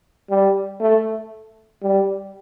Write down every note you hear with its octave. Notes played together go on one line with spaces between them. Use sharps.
G3
A3
G3